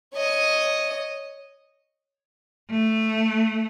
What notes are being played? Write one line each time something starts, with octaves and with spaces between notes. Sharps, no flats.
C#5 D#5
A3